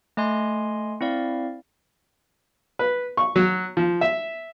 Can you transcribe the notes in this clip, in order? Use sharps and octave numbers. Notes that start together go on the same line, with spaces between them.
A3 D#5 G#5 C6
C4 E4 D5 F5
B4
C#6
F#3
F3
E5